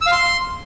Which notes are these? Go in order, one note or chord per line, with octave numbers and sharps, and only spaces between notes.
E6
F5
C6